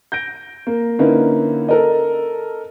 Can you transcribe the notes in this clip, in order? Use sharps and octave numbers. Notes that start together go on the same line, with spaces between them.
G6 A#6 D7
A#3
D3 A#3 C#4 D#4 E4 B4
A4 A#4 D#5